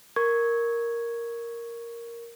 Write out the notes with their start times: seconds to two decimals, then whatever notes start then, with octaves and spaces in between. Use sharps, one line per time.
0.16 A#4 C#6 G#6